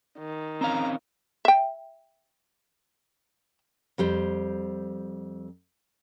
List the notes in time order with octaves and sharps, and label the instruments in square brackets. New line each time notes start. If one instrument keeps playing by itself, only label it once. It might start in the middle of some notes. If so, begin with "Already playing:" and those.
[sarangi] D#3
[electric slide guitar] C4 C#4 F5 [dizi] A#5
[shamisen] E5 G5
[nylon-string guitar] F2 G3 C5